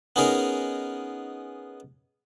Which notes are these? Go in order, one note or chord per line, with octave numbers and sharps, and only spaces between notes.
B3 C#4 D#4 G#4 A#4